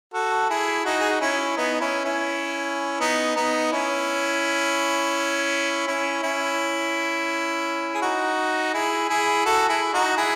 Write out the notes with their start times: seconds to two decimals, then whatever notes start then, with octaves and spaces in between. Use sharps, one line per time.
0.14 F#4 A4
0.50 E4 G#4
0.85 D#4 F#4
1.00 G#4
1.10 F#4
1.21 C#4 E4
1.57 B3 D#4
1.74 D#4
1.80 C#4 E4
2.04 C#4 E4
3.00 B3 D#4
3.36 B3 D#4
3.72 C#4 E4
5.87 C#4 E4
6.22 C#4 E4
7.94 G#4
8.02 D#4 F#4
8.74 E4 G#4
9.09 E4 G#4
9.45 F#4 A4
9.69 E4 G#4
9.93 D#4 F#4
10.17 E4 G#4